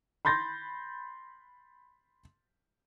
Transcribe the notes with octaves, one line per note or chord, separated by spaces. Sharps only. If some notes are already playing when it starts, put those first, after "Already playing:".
B5 C6 G6 A6 A#6